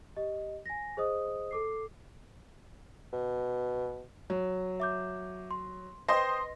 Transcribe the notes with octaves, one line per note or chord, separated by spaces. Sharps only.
G4 D#5
G#5 A#6
G#4 C5 D#5 D#6
A4 D6 C7
B2
F#3
E5 D6 G6
C6
B4 C5 D#5 G5 C6 A#6